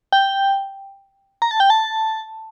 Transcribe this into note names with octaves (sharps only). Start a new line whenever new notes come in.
G5
A#5
A5
G5
A5